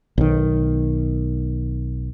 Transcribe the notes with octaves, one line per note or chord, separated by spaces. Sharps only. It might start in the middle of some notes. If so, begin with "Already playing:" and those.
B1 D#3